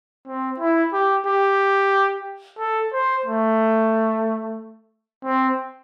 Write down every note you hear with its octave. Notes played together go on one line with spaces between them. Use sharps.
C4
E4
G4
G4
A4
C5
A3
C4